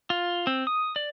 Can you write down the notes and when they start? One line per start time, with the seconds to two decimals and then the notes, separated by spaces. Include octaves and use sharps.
0.10 F4
0.47 C4
0.67 D#6
0.96 D5